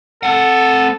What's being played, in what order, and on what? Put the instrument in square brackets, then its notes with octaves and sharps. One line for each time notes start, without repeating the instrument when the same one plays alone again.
[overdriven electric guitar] C4 F#5 [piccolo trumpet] A4